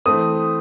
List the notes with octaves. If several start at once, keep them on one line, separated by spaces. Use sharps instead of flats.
E3 A3 C4 D#6